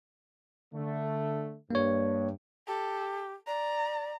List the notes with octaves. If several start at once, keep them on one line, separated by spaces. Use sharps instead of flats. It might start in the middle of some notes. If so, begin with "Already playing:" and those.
D3 A3
G2 A#3 C#5
G4 A4
D5 A#5